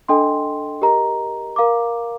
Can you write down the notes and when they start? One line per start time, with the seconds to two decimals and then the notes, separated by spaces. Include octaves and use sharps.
0.08 D4 A4 D#5 G5 C6
0.82 G4 A#4 D#5 A#5
1.56 A#4 F5 A#5 D6